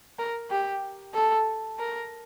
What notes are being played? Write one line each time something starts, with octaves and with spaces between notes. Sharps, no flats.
A#4
G4
A4
A#4